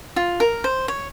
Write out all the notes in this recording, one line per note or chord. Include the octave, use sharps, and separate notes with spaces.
F4
A#4
C5
C#5